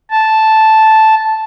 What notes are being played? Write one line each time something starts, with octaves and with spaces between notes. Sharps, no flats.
A5